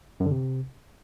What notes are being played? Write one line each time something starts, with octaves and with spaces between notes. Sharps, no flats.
F#2
D3
C3